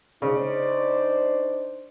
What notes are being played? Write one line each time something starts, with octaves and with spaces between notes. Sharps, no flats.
C#3 D4 D#4 C5 D5